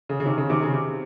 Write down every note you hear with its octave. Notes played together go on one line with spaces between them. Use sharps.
C#3
C#3
C3 D#3
C#3
C3 D#3
C#3
C3